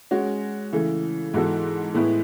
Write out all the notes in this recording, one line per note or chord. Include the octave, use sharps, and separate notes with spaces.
G#3 C#4 F#4
C#3 E3 A3
G#2 E3 B3 F#4 A4
A2 G#3 B3 E4 B4